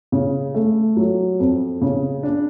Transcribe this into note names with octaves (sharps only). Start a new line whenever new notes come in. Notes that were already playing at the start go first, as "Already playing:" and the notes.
C#3
A3
F#3
F2
C#3
D4